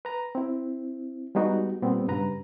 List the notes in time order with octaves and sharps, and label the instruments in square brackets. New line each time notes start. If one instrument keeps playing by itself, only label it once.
[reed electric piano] B4 A#5
C4 E4
G3 G#3 B3 D#4 F#4
A#2 G3 B3 C4
G2 C#3 B4 A#5